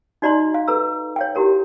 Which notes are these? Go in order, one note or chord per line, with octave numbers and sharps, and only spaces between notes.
D#4 F#4 D5 D#5 A#5 C6
F5
A4 B4 A#5 E6
C#5 F5 G5
E4 F#4 G4 A#4 C#5